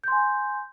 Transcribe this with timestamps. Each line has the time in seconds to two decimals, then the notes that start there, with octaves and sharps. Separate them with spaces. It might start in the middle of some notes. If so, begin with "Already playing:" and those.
0.04 G6
0.08 C6
0.12 G#5